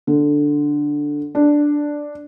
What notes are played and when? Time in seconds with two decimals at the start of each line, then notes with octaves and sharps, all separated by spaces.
0.07 D3
1.35 D4